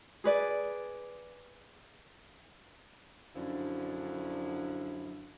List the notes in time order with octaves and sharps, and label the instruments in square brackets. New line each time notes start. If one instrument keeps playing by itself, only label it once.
[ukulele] G#4 B4 D5
[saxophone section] F#2 D3 F3 D4 E4